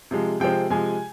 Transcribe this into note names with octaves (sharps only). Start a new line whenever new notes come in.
C3 F3 G#3
C3 F3 G#3 C4 G5
C3 F3 G#3 G#5